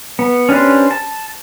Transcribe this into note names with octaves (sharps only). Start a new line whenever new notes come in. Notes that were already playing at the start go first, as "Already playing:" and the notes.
B3
C#4 D4 G4 B4 C5
A5